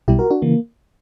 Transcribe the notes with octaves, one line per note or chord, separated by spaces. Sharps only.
B1 B2 G3 E4 G4
F#4 A#4
D4 F#4
C#3 E3 A#3